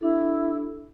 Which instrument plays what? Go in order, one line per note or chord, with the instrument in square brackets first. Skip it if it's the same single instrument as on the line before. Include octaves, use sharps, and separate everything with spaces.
[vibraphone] D4 G4 A4 [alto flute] E4